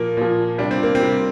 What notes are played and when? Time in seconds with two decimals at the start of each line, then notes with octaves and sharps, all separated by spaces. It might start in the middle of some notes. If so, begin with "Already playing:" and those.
Already playing: A#2 F3 A#3
0.17 A#2 F3
0.58 C3 G3 D4
0.71 C4
0.83 A#3
0.95 C4
1.00 C3 G3